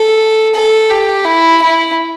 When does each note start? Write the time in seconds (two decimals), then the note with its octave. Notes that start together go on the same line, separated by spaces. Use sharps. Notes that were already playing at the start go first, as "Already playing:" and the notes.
Already playing: A4
0.55 A4
0.90 G4
1.25 E4
1.62 E4